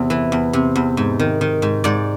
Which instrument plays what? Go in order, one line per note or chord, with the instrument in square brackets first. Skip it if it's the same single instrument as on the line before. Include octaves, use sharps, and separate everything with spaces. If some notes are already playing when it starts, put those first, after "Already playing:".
Already playing: [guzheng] E2 C3
E3
E2
C3
E2
G#2
D#3
D#3
G#2
G#2 D5